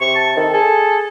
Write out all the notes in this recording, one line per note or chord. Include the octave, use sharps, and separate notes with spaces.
C3 C#6
A5
D#3 A4
G#4 A4